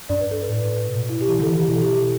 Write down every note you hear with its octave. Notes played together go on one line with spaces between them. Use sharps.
G2 D5
B4
A4
B4
A2
B2
E4
G4
E3 E4
D3 A4
E3
G4
B2 E4
A4
G4
G4